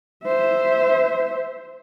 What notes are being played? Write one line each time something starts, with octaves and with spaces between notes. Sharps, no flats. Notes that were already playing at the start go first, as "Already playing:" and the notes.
C5 E5